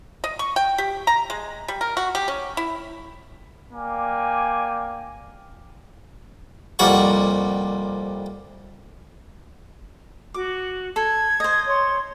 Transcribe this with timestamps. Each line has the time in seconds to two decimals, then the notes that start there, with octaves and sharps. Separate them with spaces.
0.24 D#5
0.39 C#6
0.56 G5
0.78 G4
1.07 A#5
1.30 G#3
1.68 G3
1.81 A#4
1.97 F#4
2.15 G4
2.28 C#4
2.57 E4
3.74 A#3 D5 G5 G#5
6.79 C2 F2 A#2 G3 F#5 C#6
10.34 F#4 D6
10.96 A4 G#6
11.40 C5 D#5
11.67 C#5 C6